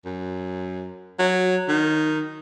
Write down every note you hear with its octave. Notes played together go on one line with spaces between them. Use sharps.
F#2
F#3
D#3